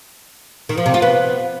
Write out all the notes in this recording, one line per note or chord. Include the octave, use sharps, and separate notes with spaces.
D#3
F3
C3
F4
B3